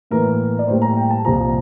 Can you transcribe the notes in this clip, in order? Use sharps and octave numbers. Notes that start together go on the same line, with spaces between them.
A2 E3 A#3 A#4
D5
A2 G3 A#3 C5
A#5
G5
A5
C2 A#2 F3 A#5